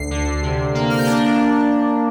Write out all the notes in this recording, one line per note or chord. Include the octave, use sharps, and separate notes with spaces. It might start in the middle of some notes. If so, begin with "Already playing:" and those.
Already playing: D2 C7
D3
C3
A#3
F6
G6
D4 A#6